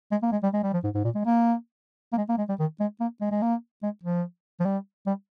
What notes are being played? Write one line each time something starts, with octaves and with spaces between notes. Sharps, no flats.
G#3
A#3
G#3
G3
G#3
G3
F3
G#2
G#2
A#2
G#3
A#3
A#3
G#3
A#3
G#3
G3
D#3
G#3
A#3
G#3
G#3
A#3
G#3
F3
F3
G3
G3